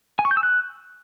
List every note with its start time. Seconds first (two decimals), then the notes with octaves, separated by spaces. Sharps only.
0.19 G#5
0.25 C#6
0.31 G6
0.37 E6
0.43 F#6